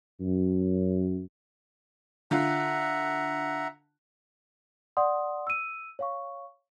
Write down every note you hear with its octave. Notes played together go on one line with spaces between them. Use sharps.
F#2
D3 F4 E5 F#5 A#5
D5 F#5 C6 D#6
E6 D#7
C#5 F5 C#6